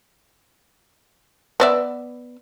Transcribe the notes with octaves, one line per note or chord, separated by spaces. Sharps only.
B3 D5 E5